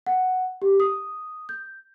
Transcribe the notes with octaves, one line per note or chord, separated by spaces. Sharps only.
F#5
G4
D#6
G6